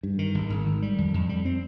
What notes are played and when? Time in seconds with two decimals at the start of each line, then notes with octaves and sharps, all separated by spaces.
0.03 G2
0.19 D#3
0.35 G#1
0.50 G#1
0.66 D#3
0.82 G3
0.98 F2
1.14 F2
1.29 G3
1.45 C4